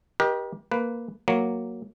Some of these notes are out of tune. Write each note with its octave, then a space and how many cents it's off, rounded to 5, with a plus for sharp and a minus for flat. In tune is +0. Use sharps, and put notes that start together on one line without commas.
G4 +0 A#4 +45 D#5 +0
A#3 +0 B4 +5
F#3 +0 A#3 +0